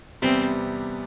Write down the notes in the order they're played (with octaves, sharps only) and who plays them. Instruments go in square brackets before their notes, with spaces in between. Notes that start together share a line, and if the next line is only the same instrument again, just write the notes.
[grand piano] E2 C3 G3 B3 [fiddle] C4